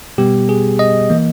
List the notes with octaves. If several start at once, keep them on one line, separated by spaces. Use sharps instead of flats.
B2 G3 B3 G4
G#4
D#5
E3 A#3